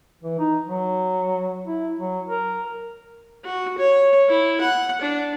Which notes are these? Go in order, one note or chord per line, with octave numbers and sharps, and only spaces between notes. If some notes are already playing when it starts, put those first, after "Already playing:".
E3
D#4
F#3
E4
F#3
A#4
F#4
C#5
E4
F#5
D4